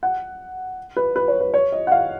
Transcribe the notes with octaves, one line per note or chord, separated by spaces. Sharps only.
F#5
B4
B4
C#5
B4
C#5
D#5
F#5
F5